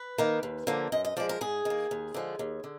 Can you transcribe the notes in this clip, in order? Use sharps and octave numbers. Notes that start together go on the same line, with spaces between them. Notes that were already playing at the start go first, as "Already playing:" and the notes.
Already playing: B4
D#3 A#3
D#2
D3 F3 A#3
F#2 D#5
D#5
F3 G#3 D5
A#4
G#2 G#4
D#3 A#3
D#2
D3 F3 G#3
D#2
D3